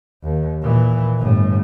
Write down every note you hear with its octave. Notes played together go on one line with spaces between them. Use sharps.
D#2
A#2 E3
G1 A2